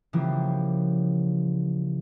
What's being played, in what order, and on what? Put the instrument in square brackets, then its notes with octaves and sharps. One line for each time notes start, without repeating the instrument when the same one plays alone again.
[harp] C#3 E3 F3 G3 A#3